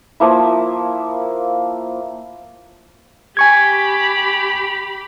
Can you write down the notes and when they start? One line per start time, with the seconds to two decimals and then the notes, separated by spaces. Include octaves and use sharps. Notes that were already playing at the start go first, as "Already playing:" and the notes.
0.20 F3 A#3 E4
3.37 G4 G#5 B5 C#6 G#6